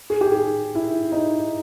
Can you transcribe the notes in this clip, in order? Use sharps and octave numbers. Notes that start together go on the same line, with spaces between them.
G#4
G4
G#4
E4
D#4